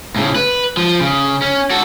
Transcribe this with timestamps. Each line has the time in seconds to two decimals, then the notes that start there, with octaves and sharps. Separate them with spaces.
0.16 A2 C#3
0.35 B4
0.77 F3
1.01 C#3
1.42 C#4
1.71 F#4 A4